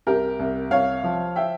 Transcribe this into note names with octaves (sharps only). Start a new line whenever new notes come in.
C2 G4 A#4
C2
C2 C#5 F5
F3
E5 G5